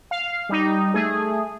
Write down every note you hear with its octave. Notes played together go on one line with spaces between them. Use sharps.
F5
G3 D#4
A3 G#4